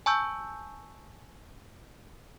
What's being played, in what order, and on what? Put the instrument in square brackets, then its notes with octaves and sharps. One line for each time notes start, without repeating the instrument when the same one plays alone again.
[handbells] G#5 A5 C#6 E6 G6